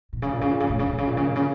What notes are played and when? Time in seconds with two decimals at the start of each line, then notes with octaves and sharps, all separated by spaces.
0.13 A#2
0.22 C#3
0.32 A#2
0.41 C#3
0.51 A#2
0.60 C#3
0.70 A#2
0.79 C#3
0.89 A#2
0.98 C#3
1.07 A#2
1.17 C#3
1.27 A#2
1.36 C#3